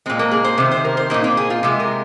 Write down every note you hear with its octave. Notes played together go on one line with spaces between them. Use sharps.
A#2 G#3 C4
A#3
G#4
C5
C3 D#3
C5
A#4
C5
A#2 A#3 D#4
C4
G#4
F4
C3 G#3
A#4